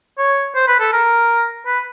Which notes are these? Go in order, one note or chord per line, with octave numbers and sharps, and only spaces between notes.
C#5
C5
B4
A4
A#4
B4